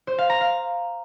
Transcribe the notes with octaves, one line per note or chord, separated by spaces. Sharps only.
C5
F5
A#5
F5